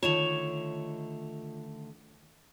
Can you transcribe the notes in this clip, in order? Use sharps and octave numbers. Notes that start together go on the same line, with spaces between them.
D3 D#3 A3 F4 C#5 E7 F7